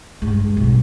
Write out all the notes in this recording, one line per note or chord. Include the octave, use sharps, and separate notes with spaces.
G2 G#3
B1 B2